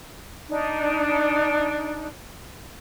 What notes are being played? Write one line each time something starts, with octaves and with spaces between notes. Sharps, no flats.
D4 D#4